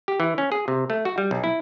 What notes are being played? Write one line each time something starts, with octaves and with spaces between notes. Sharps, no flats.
G4
E3
C#4
G#4
C3
A3
F#4
G3
B1
E4